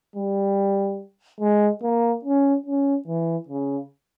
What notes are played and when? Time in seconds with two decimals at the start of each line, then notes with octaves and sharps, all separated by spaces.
0.16 G3
1.40 G#3
1.83 A#3
2.24 C#4
2.66 C#4
3.07 E3
3.48 C#3